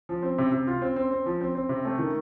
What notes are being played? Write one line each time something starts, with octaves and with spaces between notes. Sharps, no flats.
F3
C4
C3
C3
F4
C4
C4
C4
F3
C4
C4
C3
A3
D#3